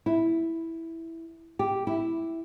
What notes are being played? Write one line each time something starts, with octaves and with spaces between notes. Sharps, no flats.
E4
G4
E4